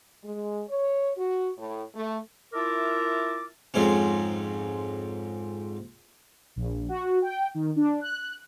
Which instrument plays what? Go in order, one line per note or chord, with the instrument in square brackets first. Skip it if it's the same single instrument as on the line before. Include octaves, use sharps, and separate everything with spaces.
[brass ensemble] G#3
C#5
F#4
A2
A3
[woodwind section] E4 F4 A#4 E5 A5 D6
[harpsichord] F2 G#2 C4 C#4
[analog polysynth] A#1
F#4
G5
D#3
D4
F#6